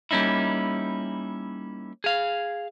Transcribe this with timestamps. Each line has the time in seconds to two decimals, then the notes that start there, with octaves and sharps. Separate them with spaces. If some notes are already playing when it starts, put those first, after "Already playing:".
0.11 G3 A#3 C#4 D#4 E4
2.04 G#4 F5